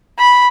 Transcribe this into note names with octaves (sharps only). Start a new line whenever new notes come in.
B5